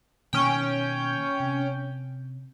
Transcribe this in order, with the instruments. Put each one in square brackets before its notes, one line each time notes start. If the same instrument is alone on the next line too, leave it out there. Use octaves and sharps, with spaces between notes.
[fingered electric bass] B2 D#3 A#3 [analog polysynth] C#4 G5
[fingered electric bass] C3